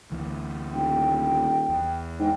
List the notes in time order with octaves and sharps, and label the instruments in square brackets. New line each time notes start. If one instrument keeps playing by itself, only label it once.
[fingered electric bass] D2 E3
[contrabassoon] D#1 [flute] G5
[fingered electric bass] E2
[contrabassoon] G#2 [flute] G5